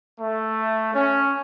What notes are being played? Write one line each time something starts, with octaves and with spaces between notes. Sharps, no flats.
A3
C#4